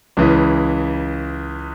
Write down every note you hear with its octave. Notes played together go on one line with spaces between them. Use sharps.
C#2 C#3 E3